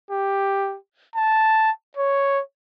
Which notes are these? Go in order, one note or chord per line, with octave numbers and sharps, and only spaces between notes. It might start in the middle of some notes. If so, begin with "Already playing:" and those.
G4
A5
C#5